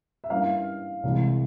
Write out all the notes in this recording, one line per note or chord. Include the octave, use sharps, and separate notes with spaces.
E5
G2 G3 A#3 C#4 E4 F5
C2 C3 E3 G#3 E4